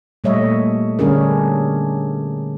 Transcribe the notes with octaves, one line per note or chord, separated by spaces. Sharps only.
A#2 G3 A3 C#5 D#5 E5
D3 G3 C#4 D4 G#4 A#4